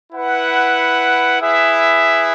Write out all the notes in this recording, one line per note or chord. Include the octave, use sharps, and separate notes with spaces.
E4 B4 F#5
E4 G#4 B4 E5